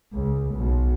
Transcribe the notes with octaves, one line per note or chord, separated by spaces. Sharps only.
C#2
B1